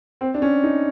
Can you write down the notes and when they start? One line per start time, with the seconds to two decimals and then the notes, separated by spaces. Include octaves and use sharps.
0.21 C4
0.34 D4
0.42 C#4
0.63 D#4